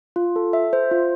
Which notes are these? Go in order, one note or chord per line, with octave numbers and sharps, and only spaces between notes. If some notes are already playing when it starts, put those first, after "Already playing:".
F4
A4
E5
C5
F4